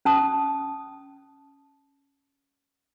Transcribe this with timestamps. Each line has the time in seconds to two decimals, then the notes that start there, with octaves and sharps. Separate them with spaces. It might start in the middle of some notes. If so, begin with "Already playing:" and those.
0.05 C#4 A5 D#6